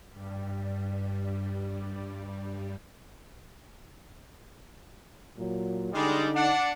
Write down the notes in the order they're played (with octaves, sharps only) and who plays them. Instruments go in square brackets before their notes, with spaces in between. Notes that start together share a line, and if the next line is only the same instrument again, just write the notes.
[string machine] G2 G3
[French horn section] A#2 F#3
[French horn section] D3 D#4 [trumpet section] G3 G#3
[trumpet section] D4 F#5